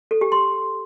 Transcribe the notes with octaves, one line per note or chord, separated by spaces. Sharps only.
A4
G4
C6